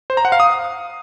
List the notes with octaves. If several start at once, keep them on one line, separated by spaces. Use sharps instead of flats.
C5
A#5
F#5
F5
D#6